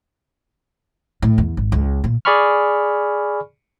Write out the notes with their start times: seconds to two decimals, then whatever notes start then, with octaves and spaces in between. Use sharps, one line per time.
1.22 A2
1.38 E2
1.57 G#1
1.72 C#2
2.04 A#2
2.25 G#4 D5 G#5 B5 C#6 F6